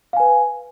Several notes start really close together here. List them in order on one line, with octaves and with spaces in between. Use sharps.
F5 G#5 B4